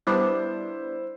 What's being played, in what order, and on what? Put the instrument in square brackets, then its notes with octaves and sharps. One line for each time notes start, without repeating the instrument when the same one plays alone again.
[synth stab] G3 B3 D4 [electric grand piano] E4 C5